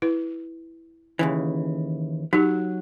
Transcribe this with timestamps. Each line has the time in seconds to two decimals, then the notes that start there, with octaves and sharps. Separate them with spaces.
0.02 E4 B4
1.19 D#2 C#3 E3
2.33 F#3 D#4 G4